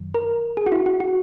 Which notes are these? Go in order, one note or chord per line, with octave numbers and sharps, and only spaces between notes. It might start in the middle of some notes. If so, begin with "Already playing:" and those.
Already playing: F#2 D#3 F#3
A#4
G#4
F#4
E4
F#4
F#4